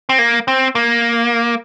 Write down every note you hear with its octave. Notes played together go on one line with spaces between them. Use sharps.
C4
A#3
C4
A#3